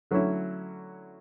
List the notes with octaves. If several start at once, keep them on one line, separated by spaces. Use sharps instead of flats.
D3 F#3 A3 C#4 E4